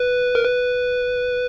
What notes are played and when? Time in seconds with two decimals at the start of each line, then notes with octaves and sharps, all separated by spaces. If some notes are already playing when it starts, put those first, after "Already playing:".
Already playing: B4
0.35 A#4
0.44 B4